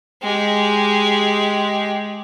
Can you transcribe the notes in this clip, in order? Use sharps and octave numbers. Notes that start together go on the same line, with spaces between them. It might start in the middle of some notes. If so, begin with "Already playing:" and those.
G#3 G4